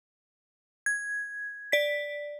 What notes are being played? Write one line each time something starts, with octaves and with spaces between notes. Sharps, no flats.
G#6
D5 B6